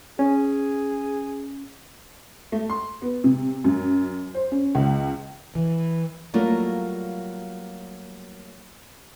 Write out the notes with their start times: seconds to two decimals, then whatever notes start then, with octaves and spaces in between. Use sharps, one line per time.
0.19 C#4 G#4
2.52 A3
2.70 C6
3.02 B3
3.24 C3
3.64 F#2
4.34 C5
4.52 C#4
4.75 C#2
5.55 E3
6.34 F#3 G3 A3 A#3 F4